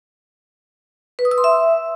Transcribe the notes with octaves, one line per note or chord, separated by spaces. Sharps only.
B4
D#6
E6
C6
E5